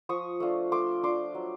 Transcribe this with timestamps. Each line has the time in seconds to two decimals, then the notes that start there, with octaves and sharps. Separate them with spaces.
0.09 F3 C#6 D#6
0.40 A3 D4 F4
0.72 A3 C6 D6
1.03 D4 F4 C6 D6
1.35 F#3